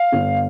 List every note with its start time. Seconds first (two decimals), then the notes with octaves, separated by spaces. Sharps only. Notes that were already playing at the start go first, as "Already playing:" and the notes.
Already playing: F5
0.12 G1